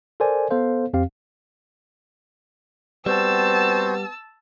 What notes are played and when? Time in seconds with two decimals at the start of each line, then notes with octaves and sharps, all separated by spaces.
0.20 A4 A#4 C5 D5 G#5
0.50 B3 A4 C5 F5
0.93 F2 C4 G4 F5
3.06 G3 B3 C4 F#4 C5 A5 E6